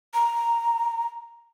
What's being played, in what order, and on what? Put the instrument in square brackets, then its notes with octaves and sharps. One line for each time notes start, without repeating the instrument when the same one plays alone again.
[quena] A#5